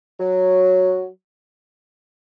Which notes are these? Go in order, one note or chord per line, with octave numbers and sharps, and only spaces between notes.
F#3